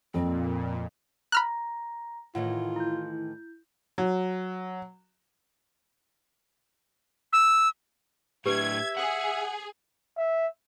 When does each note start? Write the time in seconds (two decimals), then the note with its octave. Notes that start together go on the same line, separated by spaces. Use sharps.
0.14 F2 A#2 C4
1.32 A#5 B5 F6 F#6 A#6
2.35 A2 D#3 E3 F4 F#5
2.76 E4 G6
3.98 F#3
7.33 E6
8.46 A2 D4 G4 B4 E5 G#6
8.97 G#4 F#5
10.18 E5